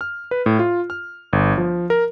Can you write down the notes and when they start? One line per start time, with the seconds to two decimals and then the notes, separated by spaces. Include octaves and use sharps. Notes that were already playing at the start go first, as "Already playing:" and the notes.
0.01 F6
0.31 B4
0.46 A2
0.59 F4
0.90 F6
1.33 G1
1.58 F3
1.90 A#4